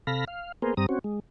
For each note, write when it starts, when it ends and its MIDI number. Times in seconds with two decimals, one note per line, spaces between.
0.07 0.25 48
0.07 0.25 69
0.07 0.25 77
0.07 0.25 83
0.07 0.25 94
0.28 0.52 77
0.62 0.74 58
0.62 0.74 59
0.62 0.74 68
0.62 0.74 70
0.62 0.74 72
0.77 0.86 43
0.77 0.86 55
0.77 0.86 60
0.77 0.86 82
0.77 0.86 87
0.89 0.99 60
0.89 0.99 61
0.89 0.99 66
1.04 1.20 56